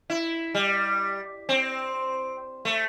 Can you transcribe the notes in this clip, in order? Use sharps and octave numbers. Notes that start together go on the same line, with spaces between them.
E4
G3
C4
A3